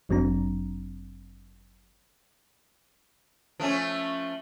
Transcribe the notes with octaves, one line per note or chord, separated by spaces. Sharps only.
G1 F#2 F#3 C4 D4 A#5
F3 A3 C#4